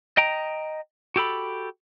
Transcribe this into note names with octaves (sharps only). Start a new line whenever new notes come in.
D#5 G5 A#5
F#4 G4 A4 B5